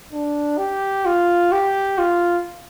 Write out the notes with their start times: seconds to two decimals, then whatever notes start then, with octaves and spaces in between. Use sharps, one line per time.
0.13 D4
0.58 G4
1.06 F4
1.52 G4
1.98 F4